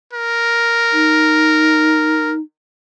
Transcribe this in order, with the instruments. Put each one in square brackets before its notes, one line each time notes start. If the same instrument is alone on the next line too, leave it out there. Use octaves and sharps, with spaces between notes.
[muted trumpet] A#4
[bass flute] D#4